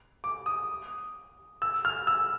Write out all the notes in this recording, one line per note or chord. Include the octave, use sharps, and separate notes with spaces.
D6
D#6
E6
F6
E6